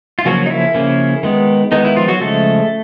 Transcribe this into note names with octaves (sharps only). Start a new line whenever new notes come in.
F4
C#3 F3 F#3 A#3 C#4 F#4
D#4
E4
C#3 F3 A#3 C#4
D#3 G#3 B3
D#3 G#3 B3 D#4
E4
F3 F4
F#3 F#4
C#3 F3 G#3 A3 A4